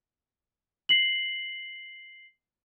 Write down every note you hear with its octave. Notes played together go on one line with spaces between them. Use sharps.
C7 F#7